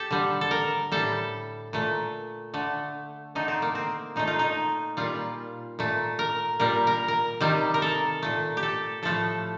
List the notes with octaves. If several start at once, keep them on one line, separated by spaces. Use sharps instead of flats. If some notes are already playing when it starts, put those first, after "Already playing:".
Already playing: G4 A4
D3 G3
A4
A#4
A2 G3 A4
A#2 A3
D3 A3
D3 A3 D#4
C4
A#3
C4
A#2 A3 D#4
F4
D#4
A#2 G3 F4
A#2 A3
A#4
A#2 G3 A#4
A#4
A#4
C3 D#3 G3
A#4
A4
A#2 A3
G4
A4
A2 F3 A3 A4